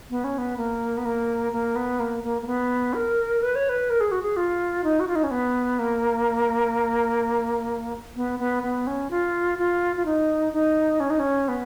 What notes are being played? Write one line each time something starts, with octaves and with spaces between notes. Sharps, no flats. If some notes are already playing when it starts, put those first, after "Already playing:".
B3
C#4
B3
A#3
B3
A#3
A#3
B3
A#3
A#3
A#3
B3
A#4
B4
C#5
B4
A#4
G#4
F#4
G#4
F4
D#4
F#4
F4
D#4
C#4
B3
A#3
B3
B3
B3
C#4
F4
F4
F4
D#4
D#4
C#4
D#4
C#4
B3